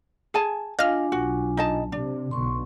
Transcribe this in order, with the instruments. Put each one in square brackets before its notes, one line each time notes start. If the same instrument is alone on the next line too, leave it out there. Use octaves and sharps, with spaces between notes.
[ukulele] G#4 G#5 A5
[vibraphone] D4 F4 G#5 [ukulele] D#5 [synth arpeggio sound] F5 F6
[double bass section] B1 [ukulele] F#4
[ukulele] D#4 D#5 A5
[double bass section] C3 [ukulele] D4
[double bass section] B1 B2 D3 [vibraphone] C6 C#6